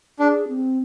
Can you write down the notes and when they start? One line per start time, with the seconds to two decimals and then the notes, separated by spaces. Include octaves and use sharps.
0.19 D4 G#4
0.48 C4